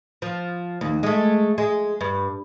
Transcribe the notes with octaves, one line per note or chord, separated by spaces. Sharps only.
F3
D#2
G#3 A3
G#3
G2